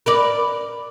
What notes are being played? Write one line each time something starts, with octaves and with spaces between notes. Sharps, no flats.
A#4 B4 D5